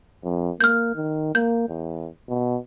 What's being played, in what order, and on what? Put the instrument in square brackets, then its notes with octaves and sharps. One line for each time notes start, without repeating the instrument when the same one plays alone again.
[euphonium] F2
[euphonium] A#3 [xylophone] F6 G6
[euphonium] D#3
[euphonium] A#3 [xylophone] G6
[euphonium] E2
B2